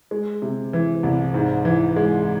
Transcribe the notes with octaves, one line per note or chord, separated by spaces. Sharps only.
G#3
C3
E3
C2
G#2
E3
G#3